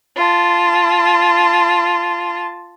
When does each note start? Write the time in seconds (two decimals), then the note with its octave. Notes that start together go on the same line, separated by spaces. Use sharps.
0.17 F4 A5